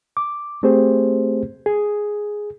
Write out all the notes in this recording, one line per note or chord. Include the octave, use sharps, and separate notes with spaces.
D6
A3 C4 G4 G#4 C5
G#4